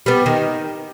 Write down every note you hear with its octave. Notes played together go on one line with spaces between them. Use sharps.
G3 B3
D#3